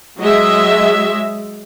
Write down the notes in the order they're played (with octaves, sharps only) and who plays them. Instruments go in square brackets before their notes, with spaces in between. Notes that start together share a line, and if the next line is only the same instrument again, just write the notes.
[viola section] F#3 G#3 D#5 E5